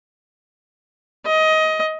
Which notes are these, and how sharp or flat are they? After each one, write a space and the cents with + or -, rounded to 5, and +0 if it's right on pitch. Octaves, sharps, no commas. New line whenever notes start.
D#5 +20